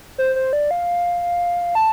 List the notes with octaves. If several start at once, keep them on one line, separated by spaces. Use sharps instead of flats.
C5
C5
D5
F5
A5